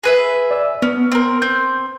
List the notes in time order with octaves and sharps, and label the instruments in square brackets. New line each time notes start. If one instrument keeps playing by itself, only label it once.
[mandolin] G#4 B4 E5
[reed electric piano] D5 E6
[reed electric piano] B3 [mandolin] C#4
[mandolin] C4 A#4
[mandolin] C4 [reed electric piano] G6